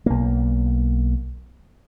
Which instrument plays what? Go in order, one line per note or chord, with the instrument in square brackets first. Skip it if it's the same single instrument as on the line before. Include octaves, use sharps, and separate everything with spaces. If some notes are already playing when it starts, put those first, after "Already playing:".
[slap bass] B1 A#3